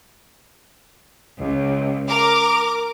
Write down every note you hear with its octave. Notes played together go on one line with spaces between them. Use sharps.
C#2
A#4 D6